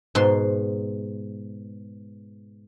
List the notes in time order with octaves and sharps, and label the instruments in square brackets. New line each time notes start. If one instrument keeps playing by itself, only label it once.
[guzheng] G#2 B2 C6